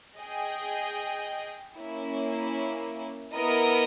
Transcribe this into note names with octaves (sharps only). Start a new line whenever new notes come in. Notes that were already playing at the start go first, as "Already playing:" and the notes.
G#4 D#5 G5
A#3 C#4 E4
B3 E4 A#4 D#5